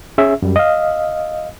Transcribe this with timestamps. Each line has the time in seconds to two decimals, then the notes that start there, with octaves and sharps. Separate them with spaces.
0.18 C#4 G#4 E5
0.42 F#2 G3
0.56 D#5 F5